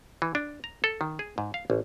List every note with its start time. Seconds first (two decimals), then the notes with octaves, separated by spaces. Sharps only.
0.22 E3
0.35 D4
0.64 A#5
0.84 A4
1.01 D#3
1.19 G#4
1.38 G#2
1.54 F5
1.70 A1